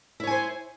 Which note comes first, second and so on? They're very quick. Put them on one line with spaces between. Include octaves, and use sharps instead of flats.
E4 C#5 G#5 C5